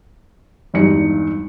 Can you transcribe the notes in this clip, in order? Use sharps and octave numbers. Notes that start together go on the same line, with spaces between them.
G#1 E2 G2 D#4 C#7